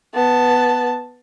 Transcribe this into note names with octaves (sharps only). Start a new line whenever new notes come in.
B3 A5